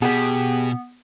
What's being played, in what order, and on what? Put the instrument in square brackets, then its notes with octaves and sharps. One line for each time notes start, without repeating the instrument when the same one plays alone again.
[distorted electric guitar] B2 [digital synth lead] B3 [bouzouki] G4 G#4